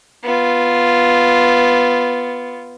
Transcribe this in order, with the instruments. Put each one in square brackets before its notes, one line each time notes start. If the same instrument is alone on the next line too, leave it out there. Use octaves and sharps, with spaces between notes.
[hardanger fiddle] B3 F4